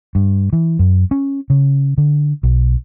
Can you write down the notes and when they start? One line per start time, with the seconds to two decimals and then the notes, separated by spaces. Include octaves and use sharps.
0.15 G2
0.53 E3
0.79 F#2
1.11 C#4
1.50 C#3
1.98 D3
2.43 B1